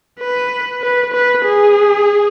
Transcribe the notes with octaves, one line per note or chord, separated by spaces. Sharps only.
B4
B4
B4
G#4